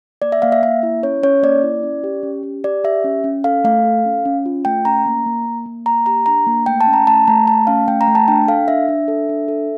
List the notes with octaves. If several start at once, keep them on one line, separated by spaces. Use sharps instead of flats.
A#3 D5
E5
A#3 F5
E5
A#3 E5
E4
C#4 C#5
C#4 C#5
A#3 D5
E4
C#4
G4
C#4
G4
G4 D5
G4 E5
C#4
C#4
A4 F5
A3 F5
A4
C#4
C#4
F4
A3 G5
C#4 A#5
A#3
A#3
A#3
A#3
A#3 A#5
G4 A#5
D4 A#5
A#3
A3 G5
A5
C#4
A#5
A3 A5
A3 A#5
A3 A5
C#4 F5
A3 G5
A#5
A3
A5
D4 G5
A4 F5
D4 E5
D4
A4
D4
A4